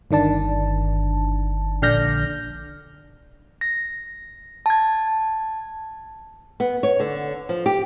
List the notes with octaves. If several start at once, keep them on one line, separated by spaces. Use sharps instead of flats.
G1 D#3 D4 A5
A#1 D3 D5 F6 G6 A#6
A#6
A5 G#6
B3
C#5
D3
F3
G4